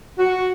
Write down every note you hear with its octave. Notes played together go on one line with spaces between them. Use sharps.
F#4